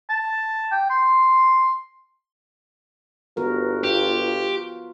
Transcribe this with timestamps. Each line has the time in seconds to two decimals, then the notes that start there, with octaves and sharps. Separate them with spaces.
0.10 A5
0.71 G5
0.90 C6
3.37 G1 B3 F#4 A#4
3.84 F4 G4